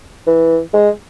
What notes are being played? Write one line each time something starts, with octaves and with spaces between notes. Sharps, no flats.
E3
G#3